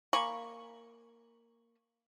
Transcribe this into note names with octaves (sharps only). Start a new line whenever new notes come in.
A#3 G#5 B5 C#6